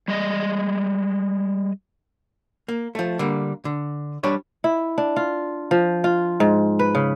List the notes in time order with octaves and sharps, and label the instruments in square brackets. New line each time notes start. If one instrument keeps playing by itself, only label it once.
[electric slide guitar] G3 G#3 D#5
[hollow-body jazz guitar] A#3
F3 A3
D3 G3 A#3
D3
G3 D4 G4 B4 C#5
[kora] E4
D4
F4
F3
F4
G#2
B4
C#3